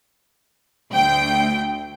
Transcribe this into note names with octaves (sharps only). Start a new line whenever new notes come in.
D2 G5